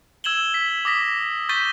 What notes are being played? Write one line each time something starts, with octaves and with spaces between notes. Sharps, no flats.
E6 G#6 E7 F#7 G7
B6
D6 D#6 A#6 B6
C#6 G6 A6 B6 D#7 G7